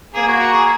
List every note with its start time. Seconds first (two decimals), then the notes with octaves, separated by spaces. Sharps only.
0.14 A#3 G#4
0.27 F#4
0.39 F#4
0.53 G#4